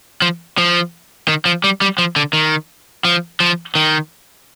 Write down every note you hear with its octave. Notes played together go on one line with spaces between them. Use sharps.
F3
F3
D#3
F3
G3
G3
F3
D3
D#3
F3
F3
D#3